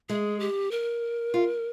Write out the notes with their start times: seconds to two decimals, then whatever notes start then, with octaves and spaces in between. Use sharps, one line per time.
0.09 G#3 G#4
0.40 G4
0.71 A#4
1.34 F4